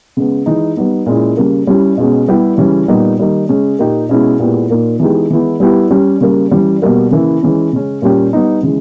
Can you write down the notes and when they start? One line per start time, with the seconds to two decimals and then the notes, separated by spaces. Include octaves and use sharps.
0.17 C#3 G#3 B3
0.46 E3 G#3 D#4
0.77 G3 B3 D#4
1.06 A#2 G#3 C#4 E4
1.37 C#3 G3 A#3
1.67 G3 C#4 E4 G4
1.98 B2 G#3 C#4
2.28 G3 B3 E4 G4
2.58 C#3 E3 G3 C#4
2.88 A#2 G3 B3 D#4 G4
3.19 D#3 G3 A#3 D#4
3.49 C#3 G#3 C#4
3.79 A#2 A#3 D#4 G4
4.09 B2 G#3 C#4 E4
4.39 A#2 G#3 B3 E4 G4
4.70 A#2 A#3 D#4
5.00 E3 G#3 B3 D#4 G4
5.30 E3 G#3 B3 E4
5.60 G3 B3 E4 G4
5.91 G3 C#4 G4
6.21 C#3 G3 A#3
6.51 E3 G3 C#4
6.82 B2 G3 A#3
7.11 C#3 E3 A#3 E4
7.42 E3 G#3 C#4
7.73 C#3 G#3 C#4
8.02 A#2 G3 C#4 G4
8.33 G3 B3 D#4
8.63 C#3 E3 G#3